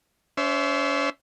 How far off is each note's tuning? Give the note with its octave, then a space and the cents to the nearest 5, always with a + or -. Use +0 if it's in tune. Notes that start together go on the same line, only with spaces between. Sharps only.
C#4 +40 C5 +0 E5 +0